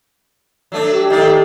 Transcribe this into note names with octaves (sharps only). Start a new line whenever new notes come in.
F#3 A3 D4
G4
D#3 A3 A#3